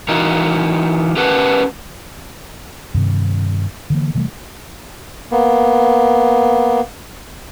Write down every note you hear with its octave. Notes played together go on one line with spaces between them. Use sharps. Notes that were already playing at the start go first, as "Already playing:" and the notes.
E3 D#4 F4 F#4 A#4
C#4 G4 A#4 B4 F#5 A5
G2 C3 D#3
D3 E3 A#3
C3 E3 G3 A3
A#3 B3